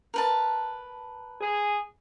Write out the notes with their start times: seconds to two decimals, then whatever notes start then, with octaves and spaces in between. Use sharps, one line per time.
0.14 A#4 B4 A5
1.41 G#4